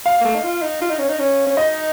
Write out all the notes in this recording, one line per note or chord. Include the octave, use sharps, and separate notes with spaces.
F5
A#3
A3
D#4
F4
D#4
F4
D#4
C#4
D#4
C#4
C#4
D#4 D#5